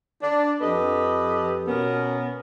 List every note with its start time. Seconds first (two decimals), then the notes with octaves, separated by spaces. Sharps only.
0.22 D4
0.61 F2 G4 A4 B4 D#5
1.67 B2 B3 C#4 A#4